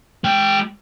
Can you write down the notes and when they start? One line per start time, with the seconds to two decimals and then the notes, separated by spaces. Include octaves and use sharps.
0.24 G#3 G5